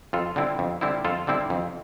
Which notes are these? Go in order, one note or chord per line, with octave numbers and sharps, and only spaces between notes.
F2 F4 A4
D3 G3 C4 E4
F2
D3 G3 C4 E4
F2 F4 A4
D3 G3 C4 E4
F2